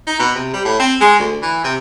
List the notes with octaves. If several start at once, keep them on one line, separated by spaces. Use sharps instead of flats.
D#4
B2
C3
G3
A2
C4
G#3
D2
E3
C3